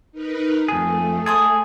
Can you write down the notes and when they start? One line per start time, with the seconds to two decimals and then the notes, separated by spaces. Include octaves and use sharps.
0.12 D#4 A#4 B4
0.68 F2 A3 G#4
1.26 G#4 A4 C5 D#6